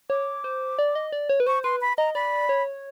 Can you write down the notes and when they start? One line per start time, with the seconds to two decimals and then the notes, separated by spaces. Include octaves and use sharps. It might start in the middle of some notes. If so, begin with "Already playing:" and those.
0.10 C#5 D6
0.44 C5
0.79 D5
0.95 D#5
1.12 D5
1.29 C#5
1.40 B4
1.47 C5 C#6
1.64 B4 C6
1.81 B5
1.98 D#5 A#5
2.15 D5 B5
2.49 C#5